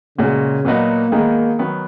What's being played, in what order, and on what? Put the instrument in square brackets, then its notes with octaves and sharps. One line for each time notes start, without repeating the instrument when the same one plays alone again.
[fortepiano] A#2 G#3 C#4 F#4 [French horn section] C#3
[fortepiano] A#2 F#3 B3 D#4 F#4 [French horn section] A#3
[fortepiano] D#3 G#3 B3 D#4
D#3 F#3 B3